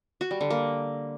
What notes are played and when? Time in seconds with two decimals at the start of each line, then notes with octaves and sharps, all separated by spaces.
0.21 F#4
0.31 G3
0.41 D3
0.50 A#3